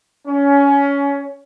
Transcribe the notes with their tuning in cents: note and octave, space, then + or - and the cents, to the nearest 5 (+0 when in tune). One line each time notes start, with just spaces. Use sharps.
C#4 +20